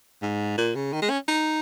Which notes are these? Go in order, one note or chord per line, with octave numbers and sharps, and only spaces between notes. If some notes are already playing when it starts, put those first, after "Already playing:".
G#2
A#2
C#3
D#3
G#3
C#4
D#4